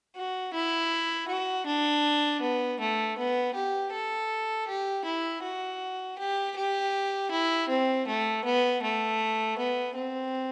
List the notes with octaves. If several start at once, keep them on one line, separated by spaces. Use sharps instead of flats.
F#4
E4
F#4
D4
B3
A3
B3
G4
A4
G4
E4
F#4
G4
G4
E4
C4
A3
B3
A3
B3
C4